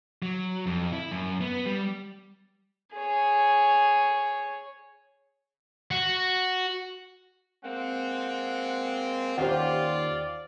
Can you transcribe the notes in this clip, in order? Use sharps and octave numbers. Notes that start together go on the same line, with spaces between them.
F#3
F2
E4
F#2
B3
G3
G#4 C#5
F#4
G#3 A#3 C4 F#5
D#2 C#4 F4 G4 C5 D5 F#5